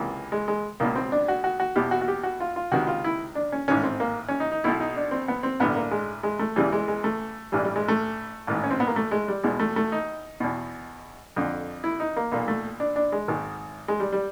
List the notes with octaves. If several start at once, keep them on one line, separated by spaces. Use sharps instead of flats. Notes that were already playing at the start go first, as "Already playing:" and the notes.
Already playing: C#2 C3 E3 A#3
G#3
G#3
C#2 B2 A#3
C4
D4
F#4
F#4
F#4
E2 B2 G4
F#4
F#4
G4
F#4
F4
F4
C#2 C3 D#3 F#4
F4
E4
D4
C#4
A1 G#2 D#3 C#4
C4
A#3
C#4
D#4
D#4
B1 B2 E4
D#4
D4
C4
B3
C4
A1 G2 D3 B3
A#3
G#3
G#3
A3
E2 C#3 E3 G3
G#3
G#3
A3
A1 G2 E3 G3
G3
G#3
A3
A1 G#2 D#3
C#4
C4
B3
A#3
A3
G#3
G3
E2 B2 G#3
A3
A3
D#4
E2 B2
F2 D3
E4
D#4
A#3
B1 A#2 A#3
A3
D4
D4
G#3
G#1 G#2 D#3
G#3
G3
G3